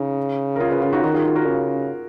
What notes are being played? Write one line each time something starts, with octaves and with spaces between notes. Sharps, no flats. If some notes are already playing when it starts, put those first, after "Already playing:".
Already playing: C#3 D#4
A#4
F4 G#4
G#4 B4
C#4 F4
D#4 F#4
D#3 D#4 F#4
F4 G#4
F4 G#4
F#4 A#4
C#3